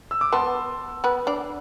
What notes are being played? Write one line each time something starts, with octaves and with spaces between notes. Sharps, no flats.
E6
D6
B3 B4 A5 C6
B3 B4
D4 D5